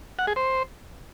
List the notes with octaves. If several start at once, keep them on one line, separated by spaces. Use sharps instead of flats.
F#5
G#4
C5